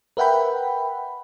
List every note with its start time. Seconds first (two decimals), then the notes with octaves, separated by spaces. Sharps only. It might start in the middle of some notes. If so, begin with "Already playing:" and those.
0.17 A#4 B4 E5 F#5 G5 B5